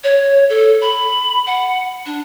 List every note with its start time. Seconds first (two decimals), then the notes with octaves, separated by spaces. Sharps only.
0.04 C#5
0.49 A4
0.81 B5
1.46 F#5
2.06 D4